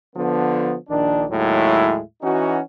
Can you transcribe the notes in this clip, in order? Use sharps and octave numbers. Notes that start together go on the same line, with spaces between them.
D3 F3 B3
A#1 D#3 D4
D#2 A2 F#3 G#3 E4
E3 C#4 D#4 F#4